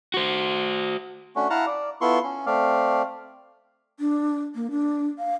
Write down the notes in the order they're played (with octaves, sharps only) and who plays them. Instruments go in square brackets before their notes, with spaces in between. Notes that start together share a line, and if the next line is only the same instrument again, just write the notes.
[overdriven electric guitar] F#4 C5
[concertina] A3 C#4 D4 F#4
E4 F5 F#5 A5 A#5
D5
B3 E4 F4 A4 C6 C#6
C#4
A3 C4 D5 F5
[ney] D4
A#3
D4
F5